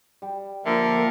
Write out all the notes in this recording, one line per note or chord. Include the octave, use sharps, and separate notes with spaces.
G3 G5
D3 F3 A#3 A#4 E5